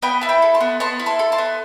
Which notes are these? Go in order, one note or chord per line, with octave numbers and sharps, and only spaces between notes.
B3 G5 B5
E4 A5
G5 B5
A4
A5 C6
B3
B3 A5 C6
E4
A5 C6
A4
A5 C6
B3